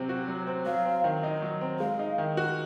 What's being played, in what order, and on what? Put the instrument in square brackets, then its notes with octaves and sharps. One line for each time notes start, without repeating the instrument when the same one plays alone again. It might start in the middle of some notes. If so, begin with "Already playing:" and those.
Already playing: [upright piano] C3 F#3 C4
F#4
F#3
C4
[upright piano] F#3 [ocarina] F5
[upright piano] C4
D#3
D#4
F#3
C4
[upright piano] G#3 [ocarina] F5
[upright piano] D#4
D#3
F#4